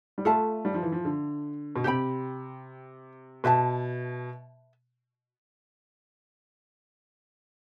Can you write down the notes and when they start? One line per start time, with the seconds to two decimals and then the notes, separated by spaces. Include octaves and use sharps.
0.18 G3
0.25 A3 F4 A4 E5 A5
0.65 G3
0.74 F3
0.83 E3
0.92 F3
1.05 D3
1.76 B2
1.84 C3 G4 C5 G5 B5
3.44 B2 B4 E5 A5